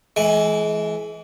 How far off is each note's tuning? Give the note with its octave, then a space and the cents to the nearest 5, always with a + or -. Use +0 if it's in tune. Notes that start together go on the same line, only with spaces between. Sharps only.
E3 +0 G#3 +35